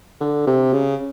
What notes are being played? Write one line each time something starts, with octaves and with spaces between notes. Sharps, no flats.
D3
C3
C#3